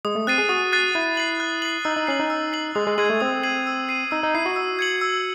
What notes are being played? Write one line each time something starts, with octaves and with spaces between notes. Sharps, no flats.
G#3 D#6
A3
C4 F#6 A6 C7 D#7
G#4
F#4 D#6
F#6 A6 C7 D#7
E4 F#6
C7 F#7
F#6
C7 F#7
D#4 E6
D#4
C#4 C7 F#7
D#4
E6
C7 F#7
G#3 D#6
G#3
G#3 G#6 C7 D#7 F#7
A3
C4 D#6
G#6 C7 D#7 F#7
E6
C7 D#7
D#4 E6
D#4
E4 C7 D#7
F#4
E6
G#6 C#7 F#7
E6